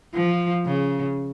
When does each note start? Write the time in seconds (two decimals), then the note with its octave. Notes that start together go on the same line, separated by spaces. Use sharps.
0.14 F3
0.66 C#3